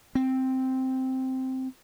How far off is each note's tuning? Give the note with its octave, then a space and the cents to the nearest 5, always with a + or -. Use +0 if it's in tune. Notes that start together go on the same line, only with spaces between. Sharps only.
C4 +0